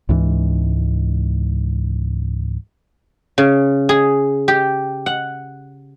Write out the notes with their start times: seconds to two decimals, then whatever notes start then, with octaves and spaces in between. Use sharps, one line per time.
0.09 C#2 G#2 E3
3.38 C#3
3.89 G#4
4.48 G4
5.06 F#5